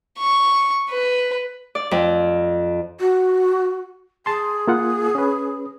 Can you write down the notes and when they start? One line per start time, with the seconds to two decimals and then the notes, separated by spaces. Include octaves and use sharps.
0.18 C#6
0.90 B4
1.75 D5
1.91 F2
3.00 F#4
4.26 G#4 A5 C6
4.68 A#3 F4 F#5
5.15 C#4 B4